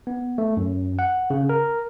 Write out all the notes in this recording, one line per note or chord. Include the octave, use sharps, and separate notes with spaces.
B3
A3
F#2
F#5
C#3
A#4